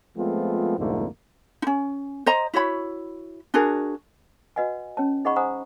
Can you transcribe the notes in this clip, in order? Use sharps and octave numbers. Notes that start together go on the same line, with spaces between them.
F3 G#3 A3 B3 C4 F4
C2 F2 G#2 D3 A3 A#3
C#4 D#4
C5 D#5 A#5
E4 F#4 C#5 B5
D4 F#4 G#4 A#4
F#4 B4 D#5 F#5 G#5
C#4 C#5 A5
D#4 G#4 D#5 F#5 B5 C#6
C5 F#5 G#5 A#5 D#6